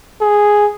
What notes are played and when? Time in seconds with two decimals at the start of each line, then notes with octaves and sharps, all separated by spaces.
0.21 G#4